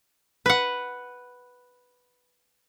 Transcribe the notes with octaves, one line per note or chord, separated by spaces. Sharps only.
B4 F#5